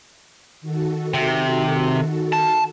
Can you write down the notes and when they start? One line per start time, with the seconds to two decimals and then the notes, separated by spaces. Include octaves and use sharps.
0.61 D#3 F#4 A4
1.14 C3
2.33 A5